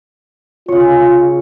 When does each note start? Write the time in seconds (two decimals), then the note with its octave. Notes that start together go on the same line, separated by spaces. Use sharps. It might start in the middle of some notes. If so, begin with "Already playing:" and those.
0.68 C#3 F4 C#5